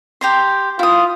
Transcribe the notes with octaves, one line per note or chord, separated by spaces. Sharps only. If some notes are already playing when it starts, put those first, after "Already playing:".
G4 A#5 C6
E4 F4 D#6